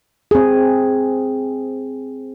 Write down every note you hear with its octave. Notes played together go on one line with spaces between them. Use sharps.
C4 G#4